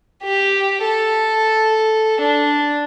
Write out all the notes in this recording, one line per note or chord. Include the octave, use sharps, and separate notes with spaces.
G4
A4
D4